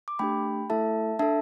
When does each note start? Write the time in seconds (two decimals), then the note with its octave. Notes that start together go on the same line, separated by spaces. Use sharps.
0.08 D6
0.19 A3 D4 G4 G5 B5
0.70 A3 E4 A4 E5 A5
1.19 D4 A4 E5 A5